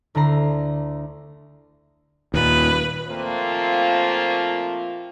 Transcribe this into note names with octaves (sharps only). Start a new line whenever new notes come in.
D2 D3 E4 A#5 C7
D#2 A#2 B4
A#2 F3 A3 A#3 C4 F4